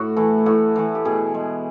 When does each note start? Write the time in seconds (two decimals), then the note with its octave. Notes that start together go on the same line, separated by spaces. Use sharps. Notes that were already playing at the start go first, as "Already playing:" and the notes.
Already playing: A2 F#4
0.16 E3 A3
0.46 A2 F#4
0.76 E3 A3
0.95 G4
1.05 B2 G#4
1.34 G#3